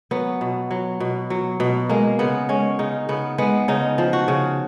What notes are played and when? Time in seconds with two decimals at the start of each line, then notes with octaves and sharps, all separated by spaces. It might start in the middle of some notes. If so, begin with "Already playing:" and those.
0.11 F#3 B3
0.41 B2
0.71 F#3
1.00 B2
1.30 F#3
1.60 B2
1.89 G#3 A#3
2.19 C#3 B3
2.49 G#3 C#4
2.79 C#3 D#4
3.09 C#3 B3
3.38 G#3 B3
3.68 C#3 D#4
3.98 F3
4.13 F#4
4.28 C#3